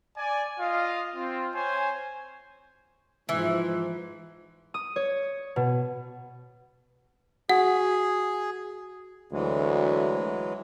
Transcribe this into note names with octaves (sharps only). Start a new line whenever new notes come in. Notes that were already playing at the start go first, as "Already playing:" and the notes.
D5 G#5
F4 D#5 F5
C4 F4
C5 C#5 G#5
G#2 E3 F3
D#6
C#5
B2
F#4 G#4 F#5
D2 E3 F#3 G#3